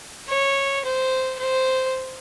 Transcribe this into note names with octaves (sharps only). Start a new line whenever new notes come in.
C#5
C5
C5